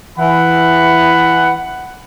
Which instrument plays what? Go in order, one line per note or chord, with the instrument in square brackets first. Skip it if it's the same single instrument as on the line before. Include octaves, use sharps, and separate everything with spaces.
[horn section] E3 F#5 B5